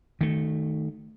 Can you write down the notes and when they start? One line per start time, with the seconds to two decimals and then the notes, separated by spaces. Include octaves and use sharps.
0.21 D#3 A3